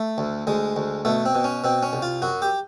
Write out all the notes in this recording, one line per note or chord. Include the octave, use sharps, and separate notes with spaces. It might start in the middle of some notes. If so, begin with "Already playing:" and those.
Already playing: A3
D2
D2 G#3
D2
B2 A3
C4
B2
C#4
B2 C4
C#4
C2
F4
F#2 F#4
G4